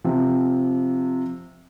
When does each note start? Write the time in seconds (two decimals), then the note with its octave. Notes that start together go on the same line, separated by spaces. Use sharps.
0.04 C3 F3